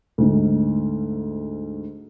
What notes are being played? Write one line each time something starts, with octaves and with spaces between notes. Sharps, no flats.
D2 G#2